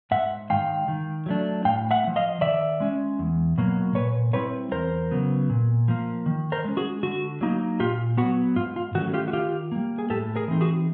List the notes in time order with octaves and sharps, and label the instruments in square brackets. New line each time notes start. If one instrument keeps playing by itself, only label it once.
[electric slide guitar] G#2 E5 F#5
D#3 G#3 F5 G5
D#3
F#3 A3 D4
A2 F5 G5
E5 F#5
A#3
F3
D#5 F5
D#3 D5 E5
G#3 C#4
E2
B2 F#3 A#3
A#2 B4 C#5
G3 C4 E4 B4 C#5
E2 A#4 C5
C#3 F#3 B3
A#2
F3 A#3
D#3
A#4 C5
G#3 C#4
F#4 G#4
D3 F#4
F#3 A#3 D#4
A#2 F4 G4
F#3 B3 F#4
G#2 F4
F4
D#3 F#3 A3 C#4 F#4
F4 G4
F#4
D#3 F4 G4
G3 A#3
G#4
A2 G4 A4
G#4 A#4
E3 A3 C4 D#4
F#4 G#4